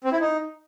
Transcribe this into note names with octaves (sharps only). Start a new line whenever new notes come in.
C4
E4
D#4